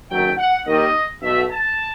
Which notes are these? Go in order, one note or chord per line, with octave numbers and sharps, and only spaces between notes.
F#1 F#2 D#3 F#3 A3 G5
F#5
D#2 D#3 G3 D#5
B1 B2 A3 E5
A5